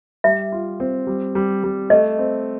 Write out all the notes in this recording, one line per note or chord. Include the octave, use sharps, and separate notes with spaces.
G3 E5
F4
C4
G3
G3
G3
A3 D#5
C4